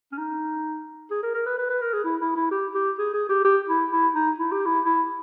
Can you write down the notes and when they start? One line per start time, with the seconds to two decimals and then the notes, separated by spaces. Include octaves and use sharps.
0.12 C#4
0.18 D#4
1.11 G#4
1.23 A#4
1.34 A#4
1.46 B4
1.58 B4
1.70 B4
1.81 A#4
1.93 G#4
2.05 E4
2.21 E4
2.36 E4
2.51 G4
2.75 G4
2.98 G#4
3.14 G#4
3.29 G4
3.45 G4
3.68 E4
3.91 E4
4.15 D#4
4.38 E4
4.52 G4
4.66 E4
4.85 E4